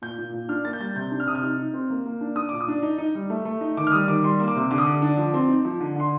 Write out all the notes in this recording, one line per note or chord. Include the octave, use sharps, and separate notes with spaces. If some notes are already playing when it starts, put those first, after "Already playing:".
A#2 G6
A#2
A#2
D4 F6
A#3 A6
G6
G3 A6
C3 G6
D4
F6
C3 D#6
F6
D#4
D#4
C4
A#3
A#3
D4
D4 D#6
A#2 D6
D#6
D4
D#4
D#4
G3
A3
A3
D#4
D#3 D6
F6
G3 D#6
D#3 D6
G3 C6
A#3
D6
C3
D3 D6
D#6
D3 D6
D4
F3
C4
D#4
F3
D3
D3 C6